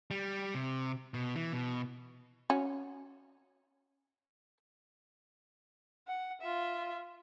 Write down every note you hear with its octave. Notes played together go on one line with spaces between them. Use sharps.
G3
C3
B2
E3
B2
C#4 F#4
F#5
F4 E5